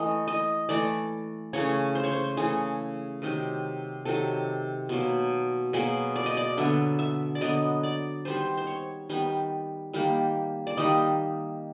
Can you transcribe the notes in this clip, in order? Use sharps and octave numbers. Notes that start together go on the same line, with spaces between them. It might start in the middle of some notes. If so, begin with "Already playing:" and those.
Already playing: E3 A3 D#5
D#5
E3 A3 D5
C#3 E3 A3 C#5
C5
C#5
C5
C#3 E3 A3 G#4
C3 D#3 F#3
C3 D#3 F#3 A4
B2 F#3 A#3
B2 F#3 A#3 G#4
D5
D#5
D5
D3 F#3 B3 E5
E5
D5
D3 F#3 B3 D#5
D5
D#3 G3 B3 C5
C5
C#5
D#3 G3 B3
D#3 G3 A#3
D5
D#3 G3 A#3 D#5